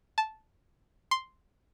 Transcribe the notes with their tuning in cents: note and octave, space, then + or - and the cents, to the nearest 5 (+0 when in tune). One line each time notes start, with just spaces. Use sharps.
A5 -10
C6 +0